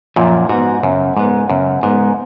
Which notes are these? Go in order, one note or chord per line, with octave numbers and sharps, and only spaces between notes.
F#2 A#2 F3
G#2 B3 F#4
F#2 C#3
G#2 G#3 B3
F#2 C#3
G#2 G#3 B3